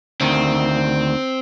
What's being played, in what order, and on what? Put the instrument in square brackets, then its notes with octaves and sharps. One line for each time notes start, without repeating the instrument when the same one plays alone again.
[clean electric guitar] D2 D#3 [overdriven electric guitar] C4